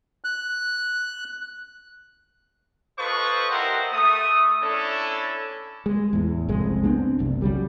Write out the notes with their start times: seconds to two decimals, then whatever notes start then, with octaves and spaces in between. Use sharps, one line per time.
0.24 F#6
2.99 F4 A4 B4 C5 D#5 C#6
3.51 E4 G4 A#4 C5 D#5 F#5
3.92 A3 D#6
4.62 A3 C#4 D4 E4 A4
5.86 G#3
6.13 E2 A2
6.48 F#1 C2 F2 G#3
6.84 A3 B3 C4 D4
7.19 F#1 C2
7.42 C#3 F#3 G3